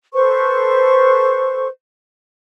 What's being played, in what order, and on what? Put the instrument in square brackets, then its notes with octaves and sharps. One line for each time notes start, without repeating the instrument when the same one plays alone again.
[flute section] A4 B4 C5 C#6